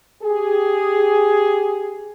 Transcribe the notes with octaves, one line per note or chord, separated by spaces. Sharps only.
G4 G#4